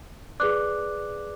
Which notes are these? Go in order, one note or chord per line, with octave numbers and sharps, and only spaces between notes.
G#4 B4 D5 D6 F#6